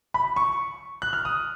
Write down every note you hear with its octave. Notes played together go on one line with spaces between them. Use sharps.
B5
C#6
F#6
F6
D#6